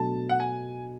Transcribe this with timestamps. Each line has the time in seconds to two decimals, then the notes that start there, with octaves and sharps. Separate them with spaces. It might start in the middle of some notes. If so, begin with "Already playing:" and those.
Already playing: B2 F#3 A3 D4 A5
0.29 F#5
0.40 G#5